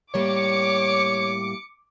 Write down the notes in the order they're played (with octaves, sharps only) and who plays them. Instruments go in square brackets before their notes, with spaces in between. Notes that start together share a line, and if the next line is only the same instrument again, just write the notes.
[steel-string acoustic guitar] A2 G3 A#3 [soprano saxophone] C#5 [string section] D6 C#7